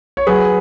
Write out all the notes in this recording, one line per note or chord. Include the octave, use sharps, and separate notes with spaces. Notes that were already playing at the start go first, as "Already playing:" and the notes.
C#5
F#3 G#4 B4